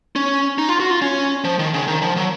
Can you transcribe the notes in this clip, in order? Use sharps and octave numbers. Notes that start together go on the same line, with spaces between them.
C#4
D#4
F4
F#4
F4
C#4
F3
D#3
C#3
D#3
F3
F#3